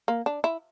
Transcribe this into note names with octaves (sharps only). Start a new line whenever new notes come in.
A#3
D4
E4